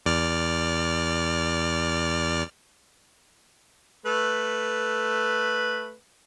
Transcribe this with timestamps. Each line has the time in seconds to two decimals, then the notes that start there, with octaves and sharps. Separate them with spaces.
0.06 E2 D5 F6
4.06 A3 B4